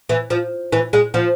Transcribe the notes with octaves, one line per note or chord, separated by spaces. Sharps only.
E3
F3
E3
G#3
F3